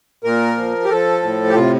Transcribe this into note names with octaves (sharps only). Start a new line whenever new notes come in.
A#2 A#4
F3
G4
F3 A4
A2
G4
C3 F4